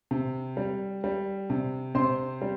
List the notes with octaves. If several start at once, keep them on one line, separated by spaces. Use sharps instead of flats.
C3
G3
G3
C3
C3 C5 C6
G3